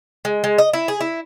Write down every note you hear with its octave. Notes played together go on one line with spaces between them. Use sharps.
G#3
G#3
D#5
E4
G#4
E4